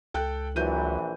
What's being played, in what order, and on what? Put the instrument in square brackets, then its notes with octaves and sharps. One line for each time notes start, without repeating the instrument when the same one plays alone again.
[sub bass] C#2 [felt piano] A4 G5 F#6
[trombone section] A#1 E3 [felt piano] F#3 G6 D#7